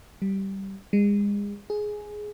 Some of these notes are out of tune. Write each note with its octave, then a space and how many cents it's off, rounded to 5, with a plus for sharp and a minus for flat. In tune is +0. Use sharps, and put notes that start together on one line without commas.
G3 -15
G#3 -35
G#4 +10